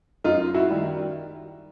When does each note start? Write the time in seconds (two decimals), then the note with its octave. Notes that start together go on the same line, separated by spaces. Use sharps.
0.24 F#2 D#4 F4
0.54 E4 F#4
0.70 D#3 G3